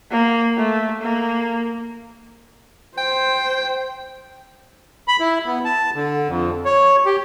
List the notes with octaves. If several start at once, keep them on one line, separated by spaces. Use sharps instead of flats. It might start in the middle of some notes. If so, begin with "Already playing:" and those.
A#3
A3
A#3
C5 G5
B5
E4
B3
A5
D3
F2
C#5
G4